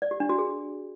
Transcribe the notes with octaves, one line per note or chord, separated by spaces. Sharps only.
D5
G4
D4
F#4
G#4